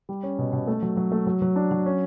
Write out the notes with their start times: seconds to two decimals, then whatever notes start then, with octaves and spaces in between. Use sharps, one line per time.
0.09 G3
0.23 C#4
0.38 B2
0.53 B2
0.67 A3
0.82 F#3
0.97 F#3
1.12 A3
1.27 F#3
1.42 F#3
1.56 D4
1.71 F#3
1.86 C#4